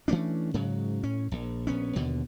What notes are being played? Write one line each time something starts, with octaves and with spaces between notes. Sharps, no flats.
E3 A3 C#4 D4
G#2 C#3 F#3
A2 C#4
A#1
A#1 B3 C#4
D#2 B2 D3